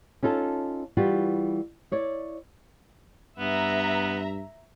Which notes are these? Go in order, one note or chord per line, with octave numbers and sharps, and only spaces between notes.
C#4 D#4 F4 A4
E3 G3 F4 F#4
E4 C#5 D5
G2 B3 E5 A#5